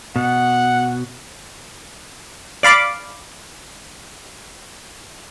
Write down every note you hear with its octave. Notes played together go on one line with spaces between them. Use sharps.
B2 F#5
D5 F5 B5 D6